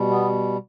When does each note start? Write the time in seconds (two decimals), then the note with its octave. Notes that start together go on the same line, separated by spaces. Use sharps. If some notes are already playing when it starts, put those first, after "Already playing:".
Already playing: B2 G3
0.10 B3